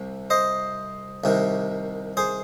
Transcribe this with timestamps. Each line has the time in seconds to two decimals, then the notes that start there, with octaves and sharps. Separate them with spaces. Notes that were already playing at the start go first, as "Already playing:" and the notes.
Already playing: C2 C3
0.30 C5 D#5
1.24 C2 C3 D#3
2.17 G#4 C5